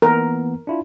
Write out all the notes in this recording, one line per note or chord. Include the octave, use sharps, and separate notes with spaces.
E3 A#3 B3 A#4
D4 E4 F4